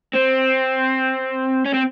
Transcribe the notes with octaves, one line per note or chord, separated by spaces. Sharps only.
C4
C#4
C4